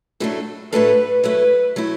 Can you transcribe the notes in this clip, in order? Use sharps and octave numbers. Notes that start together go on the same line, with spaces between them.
A2 F#3 A3 D4 A4
A2 F#3 A3 D4 A4 B4
F#3 A3 E4 B4
F#3 A3 E4